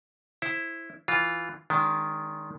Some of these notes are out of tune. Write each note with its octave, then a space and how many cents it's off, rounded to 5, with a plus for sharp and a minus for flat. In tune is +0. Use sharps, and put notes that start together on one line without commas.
E4 +0 C5 +15
E3 +0 F4 +0
D#3 +0 G#3 +0 D4 -35